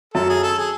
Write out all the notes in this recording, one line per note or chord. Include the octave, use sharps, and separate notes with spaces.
F#2 A4
G#4
A4
G#4